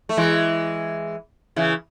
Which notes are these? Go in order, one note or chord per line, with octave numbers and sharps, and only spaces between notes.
A3
E3 G#3
C#3 E3